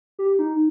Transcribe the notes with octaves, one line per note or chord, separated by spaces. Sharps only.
G4
D#4